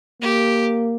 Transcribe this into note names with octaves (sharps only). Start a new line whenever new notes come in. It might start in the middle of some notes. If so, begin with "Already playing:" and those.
A#3 G4